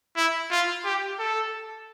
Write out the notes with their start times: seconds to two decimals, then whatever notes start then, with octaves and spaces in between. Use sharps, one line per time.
0.17 E4
0.51 F4
0.85 G4
1.19 A4